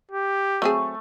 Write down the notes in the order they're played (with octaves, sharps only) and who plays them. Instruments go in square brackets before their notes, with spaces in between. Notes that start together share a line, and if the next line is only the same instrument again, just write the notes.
[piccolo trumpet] G4
[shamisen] F#3 C4 G#4 [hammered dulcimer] A3